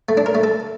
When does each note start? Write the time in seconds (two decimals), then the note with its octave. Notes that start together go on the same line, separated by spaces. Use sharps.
0.09 A3
0.17 D4
0.26 A#4
0.35 A3
0.44 A4